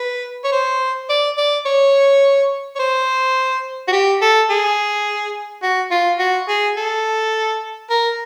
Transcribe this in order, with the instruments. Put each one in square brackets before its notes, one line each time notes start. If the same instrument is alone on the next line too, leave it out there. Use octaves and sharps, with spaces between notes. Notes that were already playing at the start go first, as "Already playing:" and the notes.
Already playing: [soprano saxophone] B4
C#5
C5
D5
D5
C#5
C#5
C5
F#4
G4
A4
G#4
F#4
F4
F#4
G#4
A4
A#4